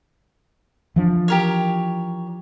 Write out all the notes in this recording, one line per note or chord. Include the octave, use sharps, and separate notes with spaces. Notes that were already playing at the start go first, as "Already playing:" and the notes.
E3 F3 D4
G4 A#4 C#5